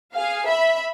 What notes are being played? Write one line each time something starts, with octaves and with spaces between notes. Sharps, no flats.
G#4 F5
E5 B5